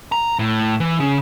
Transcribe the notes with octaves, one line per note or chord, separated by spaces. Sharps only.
A#5
A2
E3
C#3